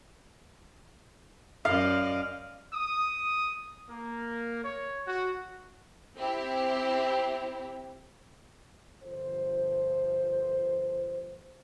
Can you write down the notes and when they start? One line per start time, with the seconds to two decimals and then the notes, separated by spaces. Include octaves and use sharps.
1.65 F#2 D5 D#5 F5
2.72 D#6
3.88 A#3
4.63 C#5
5.06 F#4
6.17 C4 E4 G4
9.03 G1 F3 C5